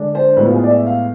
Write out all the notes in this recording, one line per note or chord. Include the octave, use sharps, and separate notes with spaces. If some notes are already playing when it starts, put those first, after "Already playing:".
Already playing: D3 G#3 D4
C5
A2 G#3 B3 B4
F4
G#4
D5
E5
F5